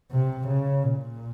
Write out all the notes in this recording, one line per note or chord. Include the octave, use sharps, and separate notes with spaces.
C3
C#3
A#2